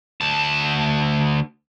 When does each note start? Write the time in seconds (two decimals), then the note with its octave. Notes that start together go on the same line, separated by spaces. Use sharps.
0.21 D2 A5